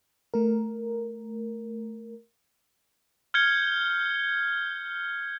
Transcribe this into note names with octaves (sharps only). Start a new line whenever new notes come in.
A3 A#4
F6 G6 G#6 C#7 G7